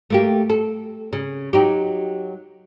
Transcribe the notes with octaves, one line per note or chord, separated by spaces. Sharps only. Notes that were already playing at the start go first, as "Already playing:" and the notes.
A3 A#3 G4
A4
C#3
F#3 D#4 G4